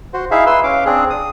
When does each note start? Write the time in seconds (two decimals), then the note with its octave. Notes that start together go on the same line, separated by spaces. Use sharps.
0.14 F#4 C5
0.31 D#4 E4 G#4 E5 F5
0.46 B4 C6 E6
0.64 C#4 F5 D6
0.85 C4 D4 G#4
1.10 D#6